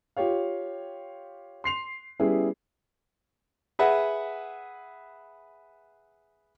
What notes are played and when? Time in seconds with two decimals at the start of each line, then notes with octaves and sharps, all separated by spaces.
0.17 F4 G4 C#5 F5
1.64 C6 C7 F7
2.20 G3 B3 C#4 E4 G#4
3.79 G#4 B4 E5 F#5